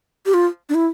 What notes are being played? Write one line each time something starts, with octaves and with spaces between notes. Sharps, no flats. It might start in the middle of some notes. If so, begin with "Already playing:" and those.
G4
F4
D4
E4